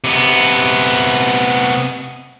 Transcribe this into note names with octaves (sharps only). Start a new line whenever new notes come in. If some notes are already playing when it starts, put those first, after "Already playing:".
C3 B3